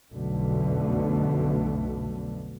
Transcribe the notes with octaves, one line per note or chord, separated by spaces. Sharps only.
B1 F2 B2 D3 A3